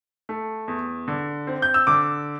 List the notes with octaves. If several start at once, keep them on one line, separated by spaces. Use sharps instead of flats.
A3
E2
D3
C4
G6
E6
D3 D6